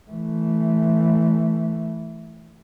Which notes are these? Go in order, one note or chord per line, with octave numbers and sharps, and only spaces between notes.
E3 A3